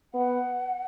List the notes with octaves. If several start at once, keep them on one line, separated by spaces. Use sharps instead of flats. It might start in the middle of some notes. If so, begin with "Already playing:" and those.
B3 F#5